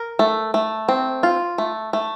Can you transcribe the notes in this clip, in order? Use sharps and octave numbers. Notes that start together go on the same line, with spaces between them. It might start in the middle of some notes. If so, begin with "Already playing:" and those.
Already playing: A#4
A3
A3
C4
F4
A3
A3